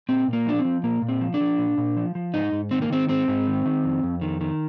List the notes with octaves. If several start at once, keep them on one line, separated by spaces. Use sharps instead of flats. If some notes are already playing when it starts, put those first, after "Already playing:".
A#2 C4
A#2
A#3
F3 D4
C4
F3
A#2 A#3
A#2
C4
F3
D4
F3
A#2
A#2
F3
F3
G#2 D#4
G#2
D#3 C4
A#3
D#3 C4
G#2 C4
G#2
D#3
D#3
F2
F2
D#3
D#3